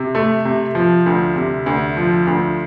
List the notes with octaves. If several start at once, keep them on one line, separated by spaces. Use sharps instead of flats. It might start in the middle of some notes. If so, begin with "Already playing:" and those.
Already playing: C3
A3
C3
F3
D2
C3
D2
F3
D2